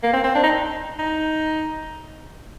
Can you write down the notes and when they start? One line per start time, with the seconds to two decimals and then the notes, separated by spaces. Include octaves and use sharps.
0.03 A#3
0.13 C4
0.24 C4
0.35 D4
0.43 D#4
0.99 D#4